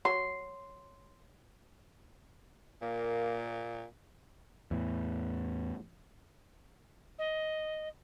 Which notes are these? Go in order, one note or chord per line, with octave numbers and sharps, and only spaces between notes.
F#3 C6
A#2 A#3
E2 A2
D#5